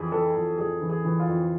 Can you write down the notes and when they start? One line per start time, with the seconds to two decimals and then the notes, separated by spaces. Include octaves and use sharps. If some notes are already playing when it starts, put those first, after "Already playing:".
Already playing: F2 E3 G#4
0.12 E3 A4
0.35 F2
0.58 F2 G#4
0.81 E3
0.90 G#4
1.04 E3
1.20 F4
1.28 F2